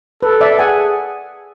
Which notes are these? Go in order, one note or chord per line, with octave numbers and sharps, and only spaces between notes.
A4 B4
D5 E5
G#4 F#5 G#5